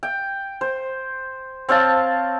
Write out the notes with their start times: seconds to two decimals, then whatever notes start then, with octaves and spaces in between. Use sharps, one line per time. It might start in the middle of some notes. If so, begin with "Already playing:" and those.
0.03 G5
0.61 C5
1.69 C4 C#5 F5 A5